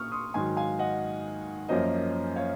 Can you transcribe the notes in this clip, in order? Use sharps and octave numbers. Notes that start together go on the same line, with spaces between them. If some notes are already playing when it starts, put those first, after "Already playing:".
Already playing: A#2 A#3 C#6 D#6 F6
C6 D#6
G#2 D#3 F#3 G#5 C6
F5 G#5
D#5 F#5
F#2 F3 A#3 C#4 C5 D#5
C#5 F5